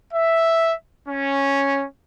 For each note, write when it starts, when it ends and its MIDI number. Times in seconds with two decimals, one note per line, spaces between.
0.13 0.72 76
1.08 1.84 61